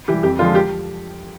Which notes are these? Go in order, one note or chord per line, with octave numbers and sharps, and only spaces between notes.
E3 G3 G4
F2 G4
D3 F3 G#3 F4
G4